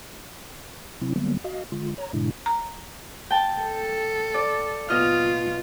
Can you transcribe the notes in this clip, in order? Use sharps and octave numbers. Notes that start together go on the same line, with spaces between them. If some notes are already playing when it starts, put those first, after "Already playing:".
C3 F#3 C4 E4
D3 F#3 G3 A#3 B3
F#4 D#5 F5
D3 G#3 F4
C#5 A#5
G#2 B2 D3 G#3 D4 E4
A#5
G5 A5
A4
D5
B2 F4 D#5 F6